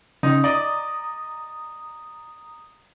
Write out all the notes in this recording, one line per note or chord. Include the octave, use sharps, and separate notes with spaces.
C#3 D#4
D5 D#5 A#5 D#6